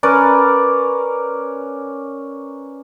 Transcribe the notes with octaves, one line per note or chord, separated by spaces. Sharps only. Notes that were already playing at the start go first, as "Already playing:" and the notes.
C#4 A#4 B4 D5